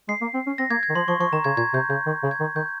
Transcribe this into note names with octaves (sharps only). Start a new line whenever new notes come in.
G#3 C7
A#3
C4
C#4
C4 A#6
A#3 G#6
G#6
D#3
F3 C6
F3 C#6
F3 C#6
D#3 A#5
C#3 G#6
A#2 G#6
C3 G6
C#3 G6
D#3
C#3
G#6
D#3
D#3 G6